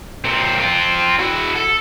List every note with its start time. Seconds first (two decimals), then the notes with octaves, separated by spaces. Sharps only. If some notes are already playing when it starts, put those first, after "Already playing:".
0.25 A#2 C4
0.60 C4 F4
1.19 E4 F#4
1.55 A4